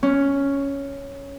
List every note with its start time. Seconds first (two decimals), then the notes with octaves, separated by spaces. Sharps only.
0.03 C#4